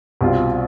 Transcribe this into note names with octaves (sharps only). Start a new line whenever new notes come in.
C2 B2 G3 C4 F4